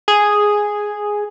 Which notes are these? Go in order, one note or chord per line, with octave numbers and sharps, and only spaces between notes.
G#4